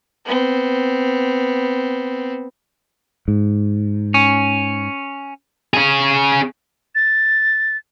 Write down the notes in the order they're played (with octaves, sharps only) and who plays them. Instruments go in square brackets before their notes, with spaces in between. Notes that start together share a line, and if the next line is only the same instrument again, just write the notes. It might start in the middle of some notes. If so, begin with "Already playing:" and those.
[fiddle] B3 C4
[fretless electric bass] G#2
[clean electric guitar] C#4
[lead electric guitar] C#4 G#4
[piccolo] A6